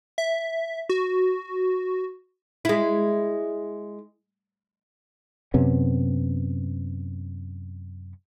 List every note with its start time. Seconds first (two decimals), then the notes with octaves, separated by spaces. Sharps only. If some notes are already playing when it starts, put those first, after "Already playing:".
0.18 E5
0.89 F#4
2.65 G#3 E4
5.54 F#2 C3 B3 C#4